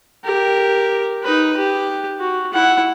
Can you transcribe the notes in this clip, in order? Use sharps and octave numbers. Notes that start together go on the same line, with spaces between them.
G4 A#4
D#4 B4
G4
F#4
E4 F#5